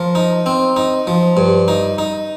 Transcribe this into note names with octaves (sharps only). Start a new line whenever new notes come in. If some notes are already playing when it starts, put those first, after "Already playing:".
Already playing: F3 A#4
D#4
C4
D#4
F3
G2
D#4
D#4